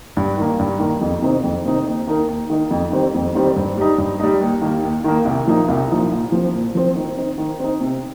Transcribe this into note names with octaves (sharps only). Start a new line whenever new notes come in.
G2
D#3 A#3
G2
D#3 A#3
F2
C3 D#3 C4 D#4
F2
C3 D#3 C4 D#4
D#2
D#3 A#3 D#4 A#4
D#2
D#3 A#3 D#4 A#4
F2
D#3 G3 C4
F2
D#3 G3 C4
G2
G3 D#4
G2
G3 D#4
D#2
D#3 A#3
D#2
D#3 A#3
C2
A#2 F3 A#3 D#4
C2
A#2 F3 A#3 D#4
A#2
F3 C4
A#2
F3 C4
D#3
C4 D#4
D#3
C4 D#4
C3